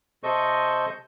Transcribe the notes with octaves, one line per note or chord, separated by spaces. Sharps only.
C3 A4 C5 D#5 C#6 G6